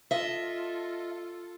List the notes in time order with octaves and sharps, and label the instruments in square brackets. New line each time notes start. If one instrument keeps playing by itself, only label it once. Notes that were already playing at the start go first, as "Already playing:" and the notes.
[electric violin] F4 A4 [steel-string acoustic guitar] D#5 E5